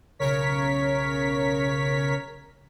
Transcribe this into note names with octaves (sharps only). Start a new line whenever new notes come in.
B1 C#3 A#4 C#5 B6